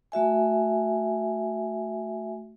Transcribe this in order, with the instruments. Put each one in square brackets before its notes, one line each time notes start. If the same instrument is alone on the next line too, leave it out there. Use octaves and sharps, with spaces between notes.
[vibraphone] A3 F#4 E5 G#5